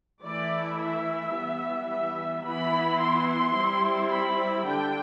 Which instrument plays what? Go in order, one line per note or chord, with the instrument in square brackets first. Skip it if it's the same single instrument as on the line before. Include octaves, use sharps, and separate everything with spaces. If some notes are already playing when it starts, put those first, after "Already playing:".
[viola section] E3 A3 E4 D5
E5
E3 G3 B3
E5
E3 B3 E4 B5
C6
G3 C4 E4
B5
D3 G3 D4 G5